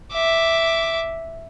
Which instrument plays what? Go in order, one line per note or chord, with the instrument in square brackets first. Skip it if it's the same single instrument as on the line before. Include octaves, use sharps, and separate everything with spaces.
[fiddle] E5 D6